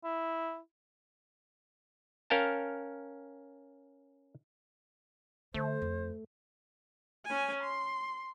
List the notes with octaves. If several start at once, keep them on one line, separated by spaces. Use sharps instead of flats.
E4
C#4 A#4 F5 G5 A5
D3 A3 C5
F2
C#4 G#5
C6